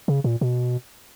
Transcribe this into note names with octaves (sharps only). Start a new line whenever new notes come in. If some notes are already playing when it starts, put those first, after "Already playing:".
C#3
A#2
B2